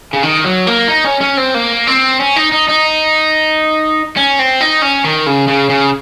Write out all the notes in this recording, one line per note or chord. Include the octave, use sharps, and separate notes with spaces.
C#3
D#3
F#3
A#3
D#4
C#4
C#4
C4
A#3
C4
C#4
D#4
D#4
D#4
C#4
C4
D#4
C#4
D#3
C#3
C#3
C#3